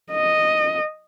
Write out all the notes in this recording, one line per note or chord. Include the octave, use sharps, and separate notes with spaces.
D#5